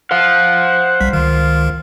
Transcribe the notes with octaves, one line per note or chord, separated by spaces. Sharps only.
C5 F5 F#5
B1 G3 B6
C#2 D#3 F4